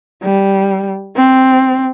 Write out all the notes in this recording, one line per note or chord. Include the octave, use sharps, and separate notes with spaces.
G3
C4